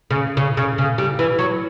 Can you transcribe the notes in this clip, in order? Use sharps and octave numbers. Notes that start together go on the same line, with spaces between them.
C#3
C#3
C#3
C#3
G3
E3
F#3